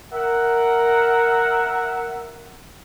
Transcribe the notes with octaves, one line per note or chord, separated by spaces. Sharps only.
A#4 E5 F#5